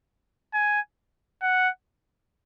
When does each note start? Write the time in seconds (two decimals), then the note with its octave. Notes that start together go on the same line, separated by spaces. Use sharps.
0.54 G#5
1.42 F#5